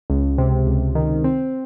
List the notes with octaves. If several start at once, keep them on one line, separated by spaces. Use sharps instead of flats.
C#2
C3
C#2
D#3
C4